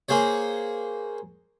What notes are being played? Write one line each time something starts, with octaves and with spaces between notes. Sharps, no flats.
A#3 G#4 C5 C#5